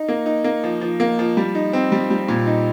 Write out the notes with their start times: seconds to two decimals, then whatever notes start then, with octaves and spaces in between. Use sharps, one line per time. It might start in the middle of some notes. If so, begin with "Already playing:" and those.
Already playing: D#4
0.09 A#3
0.26 D#4
0.44 A#3
0.64 F3
0.81 F3
1.00 A#3
1.19 F3
1.37 G3
1.55 D#4
1.73 C4
1.92 G3
2.10 G3
2.28 A#2
2.47 D#4